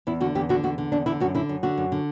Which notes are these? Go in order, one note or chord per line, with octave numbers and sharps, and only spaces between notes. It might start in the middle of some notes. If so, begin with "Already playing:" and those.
E2 E4
D3 F#4
E2 G4
D3 F#4
E2 F#4
D3
E2 D4
D3 E4
F#2 F#4
D3 E4
F#2
D3 F#4
F#2
D3